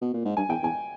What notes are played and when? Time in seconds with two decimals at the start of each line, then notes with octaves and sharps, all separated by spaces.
0.01 B2
0.13 A#2
0.25 G#2
0.37 G2 G#5
0.49 E2 G5
0.63 E2 G#5